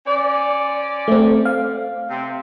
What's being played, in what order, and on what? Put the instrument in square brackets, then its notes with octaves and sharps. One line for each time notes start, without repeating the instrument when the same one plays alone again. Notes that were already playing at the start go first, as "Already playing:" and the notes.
[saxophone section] C#4 C5 D5
[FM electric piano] A3 C4
F5
[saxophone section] C3 C4